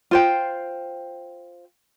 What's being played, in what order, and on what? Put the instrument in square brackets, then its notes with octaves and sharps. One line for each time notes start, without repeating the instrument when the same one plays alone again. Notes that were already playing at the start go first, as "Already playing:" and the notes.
[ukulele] F4 C5 G5